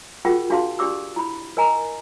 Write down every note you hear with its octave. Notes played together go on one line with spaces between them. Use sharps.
F4 F#4 G#4 A#4 F#5 G5
D4 F#4 G#4 F5 A5 C6
D4 G4 D5 D6 E6
E4 B5
A#4 D#5 G#5 A#5